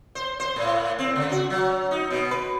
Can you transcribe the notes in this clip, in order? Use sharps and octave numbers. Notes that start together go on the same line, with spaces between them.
C5
C5
A2
C4
C#3
F#4
F#3
D#4
B2
B4